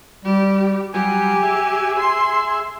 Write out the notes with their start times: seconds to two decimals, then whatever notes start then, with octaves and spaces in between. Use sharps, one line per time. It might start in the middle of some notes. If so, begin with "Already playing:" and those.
0.25 G3 G4
0.94 F#3 G3 G4 G#5
1.43 G#4 E5
1.99 C6